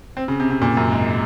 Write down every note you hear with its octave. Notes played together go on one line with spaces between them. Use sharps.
C4
C#3
C3
C3
A#2
F#2
G#2